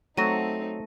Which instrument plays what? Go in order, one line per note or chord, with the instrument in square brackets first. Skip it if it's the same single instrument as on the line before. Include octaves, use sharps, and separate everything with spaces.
[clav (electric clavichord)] F#3 [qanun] A3 [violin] C4 D#4 [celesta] A#6 D#7